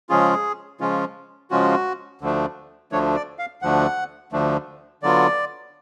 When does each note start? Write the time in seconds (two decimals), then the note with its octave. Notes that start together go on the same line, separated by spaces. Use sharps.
0.09 C#3 F3 G#3 C#4 F4 G#4
0.80 C#3 F3 G#3 C#4 F4
1.51 C#3 F3 G#3 C#4 F4 F#4
2.21 D2 D3 F3 A3 D4
2.92 D2 D3 F3 A3 D4 C#5
3.15 D5
3.39 F5
3.62 D2 D3 F3 A3 D4 F#5
4.32 D2 D3 F3 A3 D4
5.03 D3 F#3 B3 F4 D5